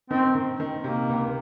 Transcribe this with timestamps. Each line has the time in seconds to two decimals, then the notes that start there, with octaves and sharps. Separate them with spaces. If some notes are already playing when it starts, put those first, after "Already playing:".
0.10 D#3 C4
0.35 D#3
0.60 D#3
0.84 C3 A#3
1.09 C#2